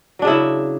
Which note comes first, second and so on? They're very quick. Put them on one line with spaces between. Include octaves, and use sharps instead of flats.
F#3 D4 C#3 E4